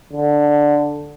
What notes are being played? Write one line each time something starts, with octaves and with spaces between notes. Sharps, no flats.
D3